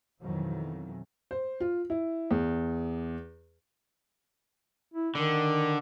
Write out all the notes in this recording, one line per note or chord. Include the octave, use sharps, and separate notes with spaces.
F2 B2 D#3 E3 F#3
C5
F4
E4
E2
E4
D3 D#3